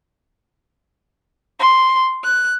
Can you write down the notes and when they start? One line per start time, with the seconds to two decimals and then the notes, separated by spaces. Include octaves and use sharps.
1.59 C6
2.23 F#6